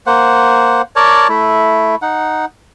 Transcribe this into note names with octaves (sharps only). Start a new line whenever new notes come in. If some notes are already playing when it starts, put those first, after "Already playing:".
A#3 C5 F#5
A#4 C#5 D5 A5
A3 E4
D#4 F#5